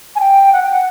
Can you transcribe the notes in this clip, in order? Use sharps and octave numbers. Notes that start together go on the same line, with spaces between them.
G#5
G5
F#5
G5
F#5